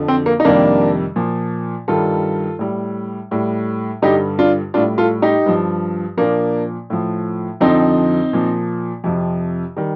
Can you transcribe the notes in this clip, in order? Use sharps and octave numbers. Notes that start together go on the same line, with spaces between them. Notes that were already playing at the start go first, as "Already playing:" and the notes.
Already playing: F2 D3 F3
C4
A#3
D#4
F2 C3 D#3 G3 A#3 D4
A#2 F3
G2 D#3 G3 F4 A4
A2 G3
A2 G3
G2 D3 G3 D#4 G4
D4 F4
A2 G3 D4 F4
F4 A4
D#4 G4
G2 F3
A#2 F3 A#3 D4
A2 F3
F2 D3 F3 C4 D#4
A#2 F3
F2 C3 F3
D#3 G3